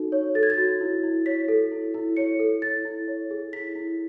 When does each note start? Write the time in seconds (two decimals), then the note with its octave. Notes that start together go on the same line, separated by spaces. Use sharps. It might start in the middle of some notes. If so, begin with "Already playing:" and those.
Already playing: D#4 F#4 A4
0.12 C#5
0.35 A4 A6
0.43 G#6
0.50 A6
0.58 F#4
0.81 E4
1.03 E4
1.26 C#5 B6
1.48 A4
1.72 E4
1.94 E4
2.17 C#5 C#7
2.39 A4
2.62 E4 A6
2.85 E4
3.08 C#5
3.31 G#4
3.53 E4 B6
3.76 E4